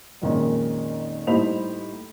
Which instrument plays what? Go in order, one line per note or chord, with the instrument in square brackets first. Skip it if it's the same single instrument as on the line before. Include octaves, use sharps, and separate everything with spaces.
[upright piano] F2 A#2 D#3 G#3 C#4 D#4
A2 G3 D#4 C5 B5 F7